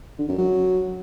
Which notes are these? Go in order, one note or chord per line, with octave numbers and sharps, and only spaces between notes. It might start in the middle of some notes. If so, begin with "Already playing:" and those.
D3
F#2
F#3